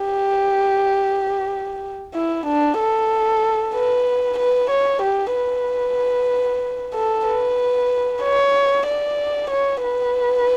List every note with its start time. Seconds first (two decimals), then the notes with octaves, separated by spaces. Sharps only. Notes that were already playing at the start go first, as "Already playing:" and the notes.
Already playing: G4
2.14 E4
2.46 D4
2.79 A4
3.75 B4
4.38 B4
4.70 C#5
5.02 G4
5.35 B4
6.95 A4
7.27 B4
8.22 C#5
8.87 D5
9.50 C#5
9.83 B4